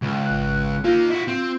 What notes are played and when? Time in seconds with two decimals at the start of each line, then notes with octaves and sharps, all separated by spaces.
0.02 C#2
0.26 G#1 F#6
0.84 A#3 D#4 F4
1.11 E4 F#4
1.28 C4